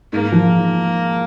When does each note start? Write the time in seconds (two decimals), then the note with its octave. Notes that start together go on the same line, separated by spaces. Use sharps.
0.12 G#2 A#3
0.32 F3